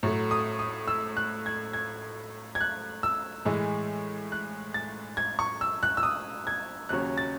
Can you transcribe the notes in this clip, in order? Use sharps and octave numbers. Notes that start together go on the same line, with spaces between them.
A2 F#3 A3
D#6
D#6
E6
F#6
G#6
G#6
G#6
F#6
E6
A2 E3 G#3
F#6
A6
G#6
C#6
E6
F#6
E6
D#6
G#6
D#2 C#3 F#3 C#4 F#6
A6